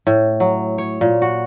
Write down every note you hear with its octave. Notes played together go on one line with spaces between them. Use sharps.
A2
F#3
C#5
A#2
F#4